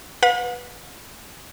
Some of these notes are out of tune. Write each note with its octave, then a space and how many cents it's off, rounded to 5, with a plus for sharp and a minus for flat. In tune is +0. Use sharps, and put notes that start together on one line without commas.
B4 -5 F#5 -45